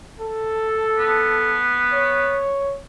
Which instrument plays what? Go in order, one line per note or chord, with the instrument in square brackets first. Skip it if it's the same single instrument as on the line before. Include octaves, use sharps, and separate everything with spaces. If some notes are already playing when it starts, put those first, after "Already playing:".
[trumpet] A4
[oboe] B3
[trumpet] C#5